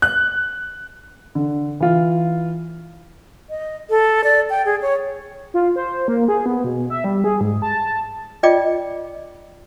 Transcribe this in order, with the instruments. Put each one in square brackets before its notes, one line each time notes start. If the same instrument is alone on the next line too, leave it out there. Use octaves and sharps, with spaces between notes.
[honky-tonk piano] F#6
[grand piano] D3
E3 F4
[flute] D#5
A4
D5
G5
G#4
C#5
[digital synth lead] F4
C5
A#3
G#4
B3
B2
E5
G3
G#4
G#2
A5
[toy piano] F4 D5 D#5 G5 D6